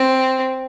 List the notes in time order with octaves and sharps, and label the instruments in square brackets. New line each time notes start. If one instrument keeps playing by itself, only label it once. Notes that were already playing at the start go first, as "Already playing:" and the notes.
Already playing: [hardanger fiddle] C4